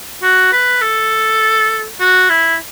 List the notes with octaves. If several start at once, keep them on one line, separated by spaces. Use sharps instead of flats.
F#4
B4
A4
F#4
E4